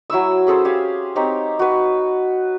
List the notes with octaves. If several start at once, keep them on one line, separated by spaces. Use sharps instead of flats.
F#3 E4 C#6 E6
C#4 G#4 A4 C5
G4 G#4 F5 G#5
C4 D#4 G4 C#5
F#4 B4